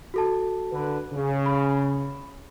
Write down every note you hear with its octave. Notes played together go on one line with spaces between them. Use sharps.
F#4 A4 A5
D3 B4
C#3
B5